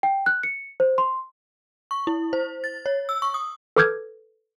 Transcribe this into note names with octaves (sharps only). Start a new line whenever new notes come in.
G5
F#6
C#7
C5
C6
C#6
E4
C5
A6
C#5
E6
C#6
D#6
A4 B4 D6 F6 G6 G#6